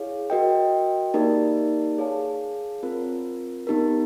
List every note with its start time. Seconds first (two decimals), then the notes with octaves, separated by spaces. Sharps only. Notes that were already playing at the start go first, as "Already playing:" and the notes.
Already playing: E4 G#4 C#5 F5
0.30 F#4 A#4 D#5 G5
1.14 A#3 D#4 G4 A#4 D5
1.98 G#4 C#5 F5 A5
2.83 C4 F4 A#4
3.67 B3 D#4 G4 A#4